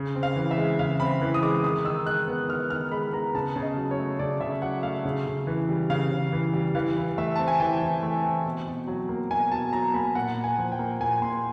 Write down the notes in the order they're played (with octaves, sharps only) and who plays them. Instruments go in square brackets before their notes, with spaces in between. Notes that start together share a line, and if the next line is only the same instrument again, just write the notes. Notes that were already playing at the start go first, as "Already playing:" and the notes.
Already playing: [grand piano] C#3
C4
F5
E3
E5
G#3
C#3 F5
C4 B5
E3
D#6
G#3 D6
D#3 D#6
D#3 E6
G#3 F#6
B3
D#3 F6
D#3 F6
G#3 B5
B3 A#5
C#3 A5
C#3
D#5
F#3
C#5
A3
C#3 D5
C#3 E5
F#3 F#5
A3 F5
C#3
C#3
E3
G3
C#3 F5
C#3
E3
G3
E3 F5
E3
A3 E5
C4 A5
G#5
E3 G5
E3
A3
C4
B2
B2
F#3
A#3
B2 G#5
B2 A5
F#3 A#5
A#3 B5
A#2 F#5
A#2
G#5
F3
G5
A#3
A#2 G#5
A#2 C6